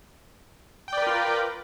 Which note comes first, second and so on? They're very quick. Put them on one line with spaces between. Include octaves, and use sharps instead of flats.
G5 D5 B4 A#4 F4